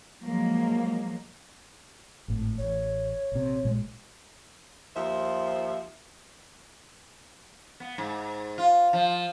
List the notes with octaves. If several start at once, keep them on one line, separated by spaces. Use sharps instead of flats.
F3 F#3 G#3 A#3
G#1 A2
A1 C#5
A#1 C3
A#1 A#2 G#3
D#2 F3 C5 E5
B3
G#2
F4
F3